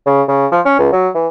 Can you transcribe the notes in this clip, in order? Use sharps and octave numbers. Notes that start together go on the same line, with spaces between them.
C#3
C#3
F3
C#4
C#2
F#3
E3